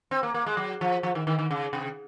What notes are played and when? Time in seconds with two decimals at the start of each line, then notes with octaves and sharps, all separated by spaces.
0.11 C4
0.23 A#3
0.34 A#3
0.46 G#3
0.57 F#3
0.81 F3
1.03 F3
1.15 D#3
1.27 D#3
1.39 D#3
1.51 C#3
1.73 C3